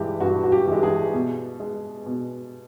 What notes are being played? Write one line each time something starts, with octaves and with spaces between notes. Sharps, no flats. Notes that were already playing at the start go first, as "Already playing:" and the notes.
Already playing: G2 E3 G#3 G4
G2 F#4
F#4
G4
E3 G#3
G#4
B2
G#3
B2